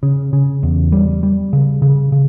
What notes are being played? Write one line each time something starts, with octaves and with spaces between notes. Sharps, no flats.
C#3
C#3
E2
G3
G3
C#3
C#3
C#3